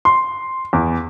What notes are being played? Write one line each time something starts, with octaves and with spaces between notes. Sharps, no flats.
C6
E2